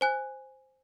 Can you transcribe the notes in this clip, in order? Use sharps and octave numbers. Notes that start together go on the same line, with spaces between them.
C5 G#5 F#6